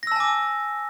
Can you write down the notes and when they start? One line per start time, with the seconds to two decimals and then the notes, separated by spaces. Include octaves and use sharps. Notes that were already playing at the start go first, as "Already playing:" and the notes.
0.03 A#6
0.07 E6
0.12 A5
0.16 G#5
0.20 D6